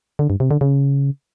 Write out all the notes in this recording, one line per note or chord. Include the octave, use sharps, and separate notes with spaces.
D3
G2
C3
D3
C#3